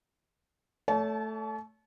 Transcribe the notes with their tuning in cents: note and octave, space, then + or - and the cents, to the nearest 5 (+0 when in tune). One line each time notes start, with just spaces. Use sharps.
A3 +0 C#5 +40 A5 -35